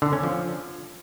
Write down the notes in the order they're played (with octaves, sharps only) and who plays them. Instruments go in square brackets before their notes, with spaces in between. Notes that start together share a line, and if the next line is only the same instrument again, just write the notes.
[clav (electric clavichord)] D3
C#4
F3